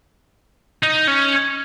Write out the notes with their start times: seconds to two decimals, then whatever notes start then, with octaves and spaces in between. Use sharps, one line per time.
0.83 D#4
1.07 C#4